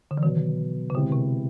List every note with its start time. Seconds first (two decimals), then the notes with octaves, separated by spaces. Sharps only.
0.11 D3
0.17 E3
0.23 B2 D#3 F#3 B3
0.90 C#3
0.94 B2 D3 G#3 C4 E4 G4
1.12 C3